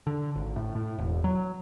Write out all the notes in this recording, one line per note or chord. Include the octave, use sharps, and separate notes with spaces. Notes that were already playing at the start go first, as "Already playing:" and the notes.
D3
G#1
A2
A2
E1
F#3